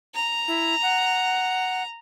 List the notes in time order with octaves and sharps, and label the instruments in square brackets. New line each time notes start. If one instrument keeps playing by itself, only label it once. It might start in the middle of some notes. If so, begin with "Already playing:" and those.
[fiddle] A#5
[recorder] E4
F#5